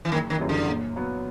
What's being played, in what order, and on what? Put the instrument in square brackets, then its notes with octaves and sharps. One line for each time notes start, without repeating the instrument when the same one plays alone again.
[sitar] E3
[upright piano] F#1 [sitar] D#3
[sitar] D#3
[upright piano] F#2 C#3 E3 G3
[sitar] D3
[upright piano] A#2
F#3 B3